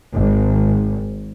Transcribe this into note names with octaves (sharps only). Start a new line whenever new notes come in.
G#1